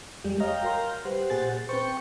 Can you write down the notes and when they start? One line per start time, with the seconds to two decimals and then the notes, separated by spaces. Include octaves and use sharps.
0.24 F2 G3 G#3 G4
0.40 C#5 D#5 F5 G5 A#5
0.63 F#4 A#4 C6
1.05 G3 G4 B4 C5 F#5
1.30 A#2 G#4 A6
1.69 C4 B4 C5 G5 C#6